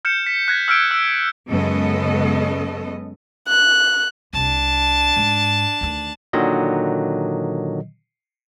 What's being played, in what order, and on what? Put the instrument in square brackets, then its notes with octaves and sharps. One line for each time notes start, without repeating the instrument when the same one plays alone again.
[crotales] F6 G6 C#7 E7
B6
F#6 G#6 A#6
E6 F6 G6 D7
E6
[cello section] F#2 C#3 G#3 B3 A4 D#5
[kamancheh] F#6
[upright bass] C2 C3 [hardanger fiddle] D4 A5
[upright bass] G#2
D2 D#3
[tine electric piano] A#2 D3 D#3 F#3 D#5